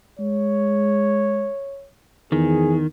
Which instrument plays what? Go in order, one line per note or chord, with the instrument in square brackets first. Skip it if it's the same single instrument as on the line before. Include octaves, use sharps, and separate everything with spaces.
[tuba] G#3 [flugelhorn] C#5
[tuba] E2 [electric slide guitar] D#3 [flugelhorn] G#4